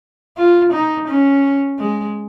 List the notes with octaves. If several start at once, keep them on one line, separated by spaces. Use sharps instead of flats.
F4
D#4
C#4
G#3